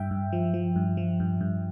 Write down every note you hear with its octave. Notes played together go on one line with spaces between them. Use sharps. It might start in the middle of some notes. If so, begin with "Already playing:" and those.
Already playing: G2 E5 G5
G2
F3
F3
G2
F3
G2
G2